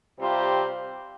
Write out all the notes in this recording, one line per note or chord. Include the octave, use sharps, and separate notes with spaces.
C3 G3 C4 F4 C5